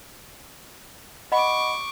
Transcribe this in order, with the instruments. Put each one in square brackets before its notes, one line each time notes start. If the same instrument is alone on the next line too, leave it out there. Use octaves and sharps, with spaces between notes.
[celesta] D#5 F#5 B5 [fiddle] C#6 D6